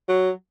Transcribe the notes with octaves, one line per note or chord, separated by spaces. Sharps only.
F#3